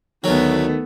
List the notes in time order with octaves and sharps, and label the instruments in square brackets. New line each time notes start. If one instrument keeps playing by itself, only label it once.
[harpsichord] D2 F#3 [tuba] D#3 [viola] A3 B3